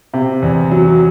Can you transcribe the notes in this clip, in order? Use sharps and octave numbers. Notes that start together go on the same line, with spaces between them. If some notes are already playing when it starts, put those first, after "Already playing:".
C3
E2
F#3